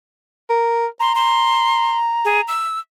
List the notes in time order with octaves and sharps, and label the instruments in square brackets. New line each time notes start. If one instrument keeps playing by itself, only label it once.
[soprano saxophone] A#4
[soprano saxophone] A#5 [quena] C6
[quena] C6
G#4
E6